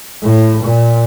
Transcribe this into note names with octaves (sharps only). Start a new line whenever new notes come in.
A2
A#2